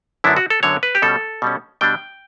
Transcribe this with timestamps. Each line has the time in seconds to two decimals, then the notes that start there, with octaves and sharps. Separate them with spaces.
0.24 F#2 D3 F#3 B3 D4 E4
0.37 F#4
0.50 A4
0.63 F#2 D3 F#3 B3 D4 C#5
0.83 B4
0.95 G4
1.02 B2 G3 C#4 A4
1.42 B2 G3 C#4
1.81 B2 G3 D4 G5